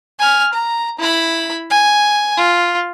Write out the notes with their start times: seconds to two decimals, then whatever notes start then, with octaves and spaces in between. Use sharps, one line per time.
0.20 G#5 F6
0.53 A#5
0.99 E4 B5
1.70 G#5
2.37 F4